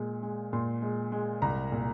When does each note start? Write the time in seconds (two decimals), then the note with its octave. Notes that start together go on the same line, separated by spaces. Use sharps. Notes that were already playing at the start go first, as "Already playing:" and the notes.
Already playing: A#2 G#3
0.23 G#3
0.53 A#2 C6
0.82 G#3
1.12 G#3
1.42 C2 A#5
1.72 A#2